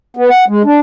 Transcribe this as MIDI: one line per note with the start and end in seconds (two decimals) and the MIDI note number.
0.17 0.29 59
0.30 0.44 78
0.48 0.63 56
0.65 0.80 62